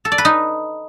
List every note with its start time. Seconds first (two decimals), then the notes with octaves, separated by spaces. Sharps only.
0.05 A4
0.12 D5
0.18 B4
0.25 D#4